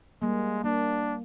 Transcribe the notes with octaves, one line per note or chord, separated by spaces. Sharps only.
G3 G#3 A#3
A#3 D4